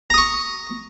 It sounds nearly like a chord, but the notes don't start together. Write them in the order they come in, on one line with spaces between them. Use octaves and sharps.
A#5 D#6 C#6